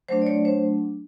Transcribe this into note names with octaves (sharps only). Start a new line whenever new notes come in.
F#3 A3 D4 C5
D5
C#5
C5